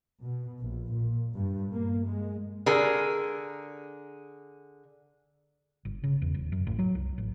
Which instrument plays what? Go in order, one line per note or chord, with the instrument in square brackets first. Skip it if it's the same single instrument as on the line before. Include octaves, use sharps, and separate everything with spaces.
[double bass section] B2
A#1
A#2
G2
A#3
G#3
[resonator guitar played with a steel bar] D3 G#4 A#4
[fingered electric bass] G1
C#3
E2
D#1
F#2
A1
F#3
C2
A1